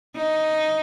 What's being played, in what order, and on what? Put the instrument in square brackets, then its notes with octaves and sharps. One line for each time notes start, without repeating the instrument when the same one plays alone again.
[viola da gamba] D#4